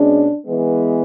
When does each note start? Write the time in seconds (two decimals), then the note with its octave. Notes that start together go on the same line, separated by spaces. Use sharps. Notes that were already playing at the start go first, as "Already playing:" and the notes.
Already playing: B2 G#3 C#4 D4
0.47 E3 G#3 B3